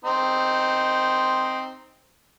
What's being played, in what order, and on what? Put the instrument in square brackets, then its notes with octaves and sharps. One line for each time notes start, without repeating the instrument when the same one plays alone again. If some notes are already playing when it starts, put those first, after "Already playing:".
[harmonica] C4 D#4